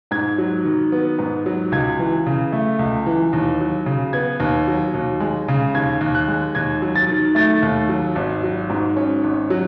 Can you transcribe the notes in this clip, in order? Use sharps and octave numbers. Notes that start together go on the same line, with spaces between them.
G#2 G#6
F#3
D#3
B3
G#2
F#3
C#2 G#6
E3
C#3
A3
C#2
E3
D#2
F#3
C#3
B3 G#6
D#2
F#3
D#2
G#3
C#3
D#2 G#6
D#2
F#6
G#3
D#2 G#6
F#3
A6
D#3
A3 A6
D#2
F#3
G#1
F#3
G#2
C#4
G#1
F#3